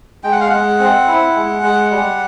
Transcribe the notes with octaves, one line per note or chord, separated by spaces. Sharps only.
G#3 G5
F#5
F5
G#3 F#5
C4
E4
G#3
G#3
G3